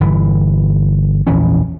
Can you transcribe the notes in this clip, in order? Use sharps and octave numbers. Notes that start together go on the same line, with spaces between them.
G1 E3
A#1 E2 E3 C#4